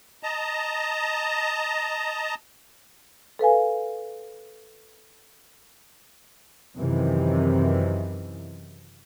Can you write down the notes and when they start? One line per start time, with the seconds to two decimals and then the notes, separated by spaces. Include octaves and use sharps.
0.23 D#5 A5 A#5
3.39 A4 B4 F5 G#5
6.77 F#2 C3 D#3 E3